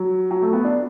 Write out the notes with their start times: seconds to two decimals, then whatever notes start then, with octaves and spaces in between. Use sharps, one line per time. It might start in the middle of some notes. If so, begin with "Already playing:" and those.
Already playing: F#3
0.31 F#3
0.42 A3
0.53 B3
0.64 D4